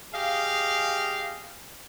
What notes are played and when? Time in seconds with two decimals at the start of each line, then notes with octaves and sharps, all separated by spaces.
0.14 G4 G#4 D#5 F5